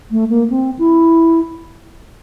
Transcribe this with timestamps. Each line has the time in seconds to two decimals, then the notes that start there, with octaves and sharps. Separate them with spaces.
0.11 A3
0.30 A#3
0.50 C4
0.79 E4